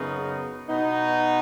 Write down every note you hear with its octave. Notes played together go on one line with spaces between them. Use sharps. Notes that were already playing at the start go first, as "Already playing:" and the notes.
Already playing: F#2 C#3 B3 D#4
B2 B3 D#4